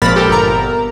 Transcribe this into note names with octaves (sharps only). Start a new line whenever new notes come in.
G#1 A#2 F3 A#4 B5 A6
G4 A4 A#4
G1 A#4 A#5